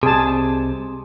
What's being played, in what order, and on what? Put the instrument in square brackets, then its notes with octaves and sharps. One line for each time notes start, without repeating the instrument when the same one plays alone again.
[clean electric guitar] C2 C3 [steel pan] G#4 A5